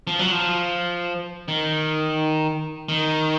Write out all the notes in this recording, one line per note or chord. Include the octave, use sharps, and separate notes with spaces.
F3
F#3
F3
D#3
D#3